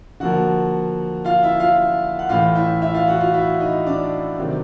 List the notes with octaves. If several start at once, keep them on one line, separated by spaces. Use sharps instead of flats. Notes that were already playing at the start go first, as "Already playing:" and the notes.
D3 F3 A#3 F#4 F#5
F4 F5
E4 E5
F4 F5
F#5
A2 E3 A3 F4 F5
E4 E5
E4 E5
F4 F5
F#4 F#5
F4 F5
E4 E5
D#4 D#5
D4 D5
C3 D#3 F#3 A3 C4